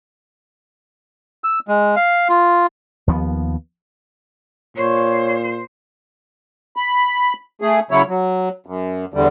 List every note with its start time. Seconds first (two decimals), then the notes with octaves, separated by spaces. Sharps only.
1.44 E6
1.68 G#3
1.96 F5
2.29 F4
3.07 D#2 F3 A3 B3
4.77 A#2 C5 C#5
6.76 B5
7.62 A3 G#4
7.91 C#3 F#3 E4 C#5
8.08 F#3
8.66 F#2
9.14 E2 D3 G3